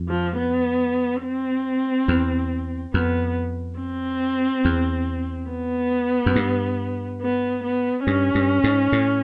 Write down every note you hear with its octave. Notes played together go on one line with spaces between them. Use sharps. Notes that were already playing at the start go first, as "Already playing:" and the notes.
Already playing: F2
F3
B3
C4
E2
F2 B3
C4
E2
B3
F#2
G2
B3
B3
G2 C#4
G2
G#2
A2